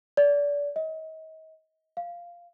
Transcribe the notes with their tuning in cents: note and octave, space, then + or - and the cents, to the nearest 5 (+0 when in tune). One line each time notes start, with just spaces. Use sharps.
D5 -30
D#5 +35
F5 -5